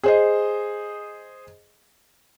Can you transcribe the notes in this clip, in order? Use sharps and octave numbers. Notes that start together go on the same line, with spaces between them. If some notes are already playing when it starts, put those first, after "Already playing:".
G#4 C5 D#5